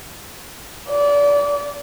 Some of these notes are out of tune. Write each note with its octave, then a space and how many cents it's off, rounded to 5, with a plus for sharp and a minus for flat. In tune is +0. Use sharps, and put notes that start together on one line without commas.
D5 -30